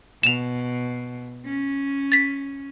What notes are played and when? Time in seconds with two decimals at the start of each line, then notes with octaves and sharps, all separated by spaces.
0.23 B2 E7 F7
1.45 C#4
2.12 A6 B6